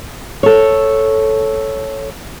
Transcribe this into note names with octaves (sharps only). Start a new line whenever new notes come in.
A4 C#5